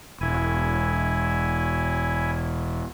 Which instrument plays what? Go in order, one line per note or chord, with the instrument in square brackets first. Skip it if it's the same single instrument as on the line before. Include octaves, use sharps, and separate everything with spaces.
[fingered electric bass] E1 [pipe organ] E4 G#5